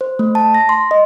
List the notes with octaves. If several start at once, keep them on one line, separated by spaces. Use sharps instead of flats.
C5
A3
A5
A#6
C6
D#5